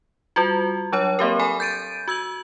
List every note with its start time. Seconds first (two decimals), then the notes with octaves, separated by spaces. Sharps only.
0.36 G3 F4 F#4
0.92 F#3 D4 C#5
1.19 A#3 C4 G4 A#4
1.39 A4 G#5 B5
1.60 G6 A6 D7 D#7
2.08 F#4 E6 G#6 F#7